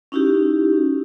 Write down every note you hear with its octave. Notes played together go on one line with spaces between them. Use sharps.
C#4 D#4 E4 F#4 G4